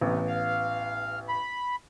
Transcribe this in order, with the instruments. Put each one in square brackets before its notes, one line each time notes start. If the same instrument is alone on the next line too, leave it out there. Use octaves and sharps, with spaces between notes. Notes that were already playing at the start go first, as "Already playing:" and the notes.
[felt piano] A1 B3 [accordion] C3
[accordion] F5
B5